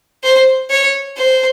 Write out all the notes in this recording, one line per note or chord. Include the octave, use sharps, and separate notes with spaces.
C5
C#5
C5